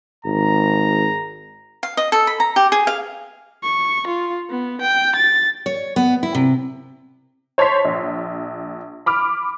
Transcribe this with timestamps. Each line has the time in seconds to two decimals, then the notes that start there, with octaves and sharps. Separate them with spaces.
0.25 G#1 A#5
1.83 F5
1.97 D#5
2.12 A4
2.27 B5
2.40 A#5
2.56 G4
2.72 G#4
2.87 F5
3.63 C#6
4.07 F4
4.50 B3
4.81 G5
5.16 A6
5.66 C#5
5.96 B3
6.23 E4
6.35 C3
7.58 C5 C#5 A5 C6 B6
7.85 A#1
9.06 B5 D6 F6